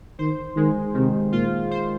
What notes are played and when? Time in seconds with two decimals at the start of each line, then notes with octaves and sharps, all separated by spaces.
0.19 D#3 C5
0.56 D#3 G#3
0.94 C3 D#3
1.32 A#2 F4
1.71 C5